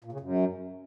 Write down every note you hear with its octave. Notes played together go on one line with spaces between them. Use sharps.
A#2
C#3
F#2